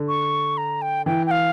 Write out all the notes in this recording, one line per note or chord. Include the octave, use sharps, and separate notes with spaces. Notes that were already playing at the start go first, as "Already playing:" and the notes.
Already playing: D3
C#6
A#5
G5
E3 G5
G5
F5